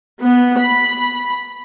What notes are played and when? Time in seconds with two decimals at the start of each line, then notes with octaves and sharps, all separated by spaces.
0.21 B3
0.59 B5